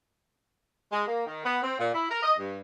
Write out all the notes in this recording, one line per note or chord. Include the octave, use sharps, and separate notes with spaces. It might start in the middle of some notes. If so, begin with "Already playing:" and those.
G#3
A#3
D#3
B3
C4
A#2
E4
A#4
D#5
G2